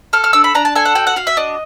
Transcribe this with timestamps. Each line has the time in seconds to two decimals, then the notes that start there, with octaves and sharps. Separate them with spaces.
0.13 A4 F6
0.24 F6
0.33 D4 E6
0.44 B5
0.55 D4 A#5
0.65 A5
0.75 A4 G#5
0.85 F#5
0.95 F#4 G5
1.07 F#5
1.16 F#4 F5
1.27 E5
1.37 D4 D#5